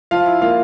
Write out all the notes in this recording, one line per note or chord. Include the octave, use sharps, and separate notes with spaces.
F3 F4 F5
E4
A#3 F4 F5